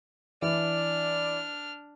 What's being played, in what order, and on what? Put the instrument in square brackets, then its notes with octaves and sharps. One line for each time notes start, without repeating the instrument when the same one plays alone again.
[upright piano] E3 [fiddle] D4 F6 [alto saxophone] D5